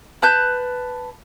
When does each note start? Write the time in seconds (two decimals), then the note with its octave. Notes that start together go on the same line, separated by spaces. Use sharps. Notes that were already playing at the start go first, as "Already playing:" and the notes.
0.22 B4 A5 F#6 G6